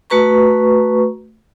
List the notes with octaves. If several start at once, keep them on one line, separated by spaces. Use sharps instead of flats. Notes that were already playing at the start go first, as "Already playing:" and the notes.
A3 F#4 B4 A#5 C#6